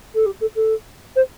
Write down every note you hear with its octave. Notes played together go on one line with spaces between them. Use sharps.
A4
G4
A4
A4
C5